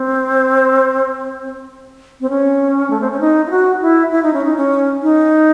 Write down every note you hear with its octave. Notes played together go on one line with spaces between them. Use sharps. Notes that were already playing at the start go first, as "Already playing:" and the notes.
Already playing: C4
C4
C#4
A3
C4
C#4
D#4
E4
F#4
E4
E4
D#4
C#4
D#4
C#4
D#4